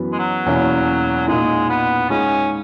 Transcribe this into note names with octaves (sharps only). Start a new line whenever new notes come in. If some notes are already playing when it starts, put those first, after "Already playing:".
Already playing: F#2 E3 B3 F#4 B4
G#3
F#3
E2 B2 A#3 C#4 E4
A#2 G#3 A#3 D#4
B3
G#3 C#4 D#4 G#4 D#5